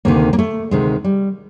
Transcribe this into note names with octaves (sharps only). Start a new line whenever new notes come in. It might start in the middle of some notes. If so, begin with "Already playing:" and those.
D2 C3 D#3 A#3
A#3
A3
D2 C3 D#3 G#3
G3